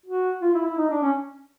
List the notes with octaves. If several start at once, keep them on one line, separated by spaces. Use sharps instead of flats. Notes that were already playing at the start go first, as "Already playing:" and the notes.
F#4
F4
E4
E4
D#4
D4
C#4